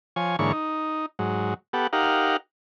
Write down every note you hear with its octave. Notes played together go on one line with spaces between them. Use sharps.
F3 C#5 G#5
G#2 D3 E3 A#3 C#5 C#6
D#4
G#2 F#3
B3 G4 A4 F#5
D#4 G4 A#4 F5 F#5